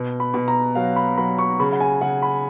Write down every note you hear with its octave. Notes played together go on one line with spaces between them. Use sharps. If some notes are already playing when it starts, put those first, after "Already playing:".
Already playing: B2
B5
B2
A#5
F#3 F5
B5
F#3 B5
C#6
C#3 B5
F#5
G#5
C#3 F#5
B5